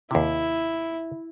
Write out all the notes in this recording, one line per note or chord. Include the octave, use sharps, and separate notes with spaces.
D#2 C3 E4